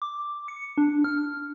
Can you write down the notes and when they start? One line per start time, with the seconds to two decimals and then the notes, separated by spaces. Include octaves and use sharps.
0.02 D6
0.48 C#7
0.77 D4
1.04 F6